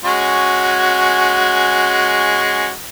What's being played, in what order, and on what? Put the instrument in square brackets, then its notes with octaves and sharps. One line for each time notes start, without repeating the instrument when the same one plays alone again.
[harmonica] G#3 C#4 F#4